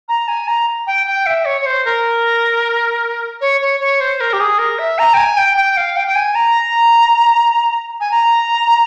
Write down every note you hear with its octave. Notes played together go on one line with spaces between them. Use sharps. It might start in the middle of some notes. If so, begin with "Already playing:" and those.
A#5
G#5
A#5
G5
G5
E5
C#5
C#5
C5
A#4
C#5
C#5
C#5
C5
A#4
G4
G#4
A#4
E5
A#5
G5
G#5
G5
G5
F5
G5
G5
G#5
A#5
G#5
A#5